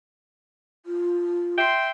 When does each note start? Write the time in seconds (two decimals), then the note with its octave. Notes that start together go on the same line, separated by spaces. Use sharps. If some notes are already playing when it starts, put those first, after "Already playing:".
0.86 F4
1.58 E5 G5 C6